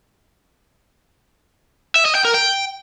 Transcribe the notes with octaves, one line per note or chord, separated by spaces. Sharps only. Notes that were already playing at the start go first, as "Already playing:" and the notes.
E5
D#5
G5
A#4
G5